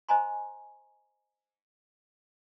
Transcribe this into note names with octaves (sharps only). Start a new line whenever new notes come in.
C5 D#5 G#5 A#5 C6